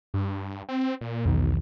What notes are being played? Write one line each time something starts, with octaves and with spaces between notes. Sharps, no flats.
G2
C4
A#2
B1 E2 B2 D#3